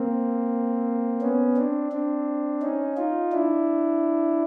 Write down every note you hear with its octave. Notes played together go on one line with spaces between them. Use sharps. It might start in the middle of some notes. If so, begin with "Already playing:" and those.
Already playing: A#3 C4
B3 C#4
C4 D4
C4 D4
C#4 D#4
D#4 F4
D4 E4